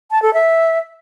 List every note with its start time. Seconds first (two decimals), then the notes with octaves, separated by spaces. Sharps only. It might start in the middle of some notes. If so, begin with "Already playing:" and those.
0.11 A5
0.22 A4
0.34 E5